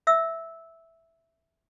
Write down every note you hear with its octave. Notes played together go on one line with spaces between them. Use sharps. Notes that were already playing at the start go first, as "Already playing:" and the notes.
E5 E6